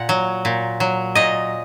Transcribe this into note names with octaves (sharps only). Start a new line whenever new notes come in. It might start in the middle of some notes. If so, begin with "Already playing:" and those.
Already playing: A#2 F#5
F#3
A#2
F#3
A#2 D#5